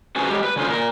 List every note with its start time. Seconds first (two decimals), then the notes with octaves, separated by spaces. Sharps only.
0.16 C#4 F#4 G#4 B4 C5
0.29 F#3 G#3 G4
0.44 B4
0.56 D3 C#4 F4 C5
0.69 A#2 A#4